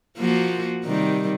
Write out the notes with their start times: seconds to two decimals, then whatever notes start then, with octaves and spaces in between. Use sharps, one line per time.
0.19 F3 A#3 F#4
0.85 C3 D#3 G3